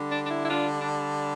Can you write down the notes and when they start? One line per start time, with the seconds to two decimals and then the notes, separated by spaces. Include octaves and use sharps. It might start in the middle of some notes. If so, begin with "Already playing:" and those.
Already playing: D3 G3
0.11 D4
0.25 D4
0.31 E4
0.45 E4
0.50 D4 F4
0.81 D4